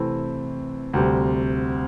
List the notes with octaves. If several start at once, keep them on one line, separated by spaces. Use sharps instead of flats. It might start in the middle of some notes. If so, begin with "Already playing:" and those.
Already playing: C3 E3 A3 C4 E4
D2 C3 G3 C4